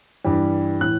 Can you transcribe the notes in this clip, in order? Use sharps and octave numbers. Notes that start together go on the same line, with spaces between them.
G2 E3 G3
A2 E3 F#6